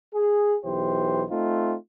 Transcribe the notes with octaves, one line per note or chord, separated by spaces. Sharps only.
G#4
B1 E3 G4 C5
A3 C4 D#4 F4